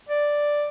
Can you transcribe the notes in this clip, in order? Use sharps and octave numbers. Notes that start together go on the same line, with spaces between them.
D5